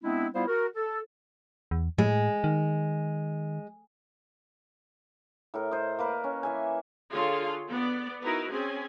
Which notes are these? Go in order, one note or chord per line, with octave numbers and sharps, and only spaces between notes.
G#3 B3 C4 D4 E4
G3 B3 E4 F4 C5 F5
F#4 A#4
A4
E2
A2 G#3
D#3
A2 A#4
C5 D#5
A#3 A#4 B4
C#4
E3 E5 G#5
D3 F4 G#4 C#5 F5 C6
B3 D5
D#4 E4 F#4 A#4 B4
C4 C#4 G#4 G#5